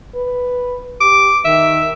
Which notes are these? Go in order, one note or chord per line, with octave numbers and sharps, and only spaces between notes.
B4
G4 D6
D#3 E5